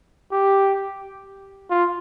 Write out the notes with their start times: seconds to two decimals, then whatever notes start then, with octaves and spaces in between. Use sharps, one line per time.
0.32 G4
1.70 F4